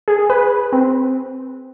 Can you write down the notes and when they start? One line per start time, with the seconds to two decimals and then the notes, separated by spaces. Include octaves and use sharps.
0.08 G#4
0.30 B4
0.72 C4